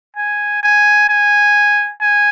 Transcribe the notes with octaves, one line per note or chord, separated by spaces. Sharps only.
G#5
G#5
G#5
G#5